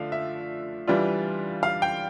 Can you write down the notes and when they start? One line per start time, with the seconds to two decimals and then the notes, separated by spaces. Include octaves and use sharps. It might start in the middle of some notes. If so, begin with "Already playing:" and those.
Already playing: D3 F3 A3 D4 F5
0.12 E5
0.88 E3 G3 D4 F4
1.63 F5
1.82 G5